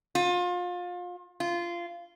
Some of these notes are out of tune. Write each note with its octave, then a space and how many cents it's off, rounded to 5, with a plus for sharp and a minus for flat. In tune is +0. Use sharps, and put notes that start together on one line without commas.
F4 +30
F4 -15